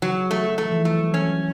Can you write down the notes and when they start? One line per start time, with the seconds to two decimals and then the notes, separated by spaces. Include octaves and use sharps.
0.02 C#3 F#3
0.31 A3
0.58 E3 A3
0.65 F3
0.71 E3
0.85 F#3 A3
1.00 G3
1.13 F#3 C#4